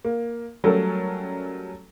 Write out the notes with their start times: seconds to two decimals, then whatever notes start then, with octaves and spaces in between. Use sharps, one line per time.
0.05 A#3
0.64 F#3 G3 A3 C#4 A4 A#4